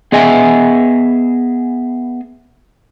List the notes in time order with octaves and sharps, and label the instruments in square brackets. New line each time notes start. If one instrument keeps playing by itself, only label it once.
[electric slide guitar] B3 G#4 D#5 E5 G#5